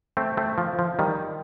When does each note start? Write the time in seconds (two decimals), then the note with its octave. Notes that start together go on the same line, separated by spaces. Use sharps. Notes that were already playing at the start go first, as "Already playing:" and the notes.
0.17 A3 C4
0.37 A3 C4
0.58 F3
0.79 F3
0.99 D#3 G3